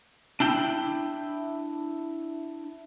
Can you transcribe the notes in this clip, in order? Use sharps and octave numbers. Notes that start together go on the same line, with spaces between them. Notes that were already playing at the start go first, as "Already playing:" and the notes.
D4 E4 G5